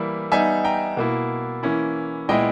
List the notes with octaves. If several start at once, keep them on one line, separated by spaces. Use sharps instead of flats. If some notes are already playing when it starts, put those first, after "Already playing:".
Already playing: E3 G3 A#3 E4
G3 B3 D#4 E5 G#5
G5 A#5
B2 A#3 E4
E3 A#3 C#4 E4
A#2 G#3 B3 E4 D#5 G5